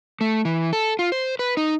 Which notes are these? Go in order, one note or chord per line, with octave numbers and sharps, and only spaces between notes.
A3
E3
A4
F4
C5
B4
D#4